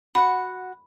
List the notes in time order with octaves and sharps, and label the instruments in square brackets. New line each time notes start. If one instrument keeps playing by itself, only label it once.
[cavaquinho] F#4 F#5 [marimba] B5